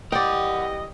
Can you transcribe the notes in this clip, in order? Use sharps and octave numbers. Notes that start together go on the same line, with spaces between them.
E3 G3 G4 A#4 D5 D#5 F#5 G5